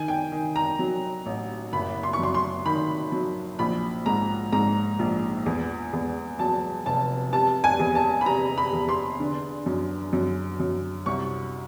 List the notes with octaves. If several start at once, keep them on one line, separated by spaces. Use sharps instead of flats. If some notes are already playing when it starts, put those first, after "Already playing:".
Already playing: D#3 G#5
G5
D#3
A#5
F#3
A1
F#1 B5
C6
C#6
F#2 C6
C6
D#3 B5
F#3
A#1 B5
G#2 A#5
G#2 A#5
A#1
E2
E2
F#3 A5
F1 A5
C3 A5
G#5
E2
A5
B5
C3 A#5
B5
E2
C6
D3
F#2
F#2
F#2
C2 C#6